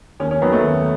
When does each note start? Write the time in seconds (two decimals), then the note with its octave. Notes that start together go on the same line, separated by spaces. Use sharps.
0.20 D#2 C#4
0.31 C#4
0.42 D#3 F#3 B3
0.53 A3
0.64 D#2